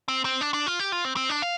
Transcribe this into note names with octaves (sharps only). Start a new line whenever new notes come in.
C4
C4
D4
D4
F4
G4
F4
C4
C4
D4
F5